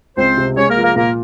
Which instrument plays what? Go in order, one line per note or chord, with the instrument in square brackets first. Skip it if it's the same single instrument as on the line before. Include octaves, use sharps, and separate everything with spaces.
[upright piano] C#2 [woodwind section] C4 C5
[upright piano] C3
[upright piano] G#3 [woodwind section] C#4 C#5
[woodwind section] A#3 A#4
[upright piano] F3
[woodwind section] A#3 A#4
[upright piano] A#2 [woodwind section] A#3 A#4